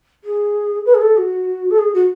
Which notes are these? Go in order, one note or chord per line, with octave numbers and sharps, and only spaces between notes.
G#4
B4
G#4
A4
F#4
A4
G#4
F#4